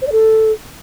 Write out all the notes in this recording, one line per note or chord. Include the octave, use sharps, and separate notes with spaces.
C5
D5
A4